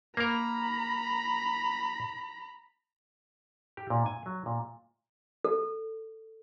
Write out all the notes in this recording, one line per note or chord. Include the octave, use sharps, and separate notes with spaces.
A#3 A#4 A#5 B5
G4
A#2
G#5
F#3
A#2
A4